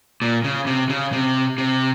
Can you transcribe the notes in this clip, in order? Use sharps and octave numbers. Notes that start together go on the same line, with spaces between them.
A#2
C#3
C3
C#3
C3
C3